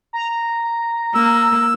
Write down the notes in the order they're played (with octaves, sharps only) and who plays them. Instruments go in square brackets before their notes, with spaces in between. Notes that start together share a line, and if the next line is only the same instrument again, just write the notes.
[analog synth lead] A#5
[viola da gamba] A#3 [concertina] E6